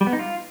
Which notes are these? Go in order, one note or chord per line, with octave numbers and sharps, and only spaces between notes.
G3
B3
D#4
F4